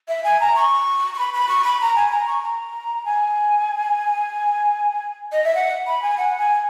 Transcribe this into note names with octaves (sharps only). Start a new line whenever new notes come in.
E5
G#5
A#5
C#6
C#6
B5
B5
C#6
B5
A#5
G#5
A#5
C#6
A#5
G#5
D#5
E5
F#5
B5
G#5
F#5
G#5